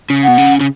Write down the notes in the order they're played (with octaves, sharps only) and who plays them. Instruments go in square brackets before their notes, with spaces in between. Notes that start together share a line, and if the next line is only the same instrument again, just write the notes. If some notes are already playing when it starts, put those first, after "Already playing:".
[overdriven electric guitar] C#3
[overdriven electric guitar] B2 [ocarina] F#5
[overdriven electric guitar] C#3
C#3